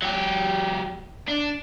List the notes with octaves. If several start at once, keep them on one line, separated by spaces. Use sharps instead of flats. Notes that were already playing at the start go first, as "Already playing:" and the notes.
F#3 G4
D4